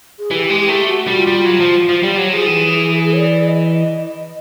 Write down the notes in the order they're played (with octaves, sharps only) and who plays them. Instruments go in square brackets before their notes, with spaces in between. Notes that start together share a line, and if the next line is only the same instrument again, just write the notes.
[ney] G#4
[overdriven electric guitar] E3 [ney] G4
[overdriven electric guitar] G#3
[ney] G4
[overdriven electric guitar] A3
[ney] F#4
[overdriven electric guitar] G3
[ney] F4
[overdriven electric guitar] G3
F#3
F3
F3
[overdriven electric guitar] G3 [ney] G4
[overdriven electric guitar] F#3
[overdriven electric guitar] F3 [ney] G#4
[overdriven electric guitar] E3
[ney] C#5
D5
D#5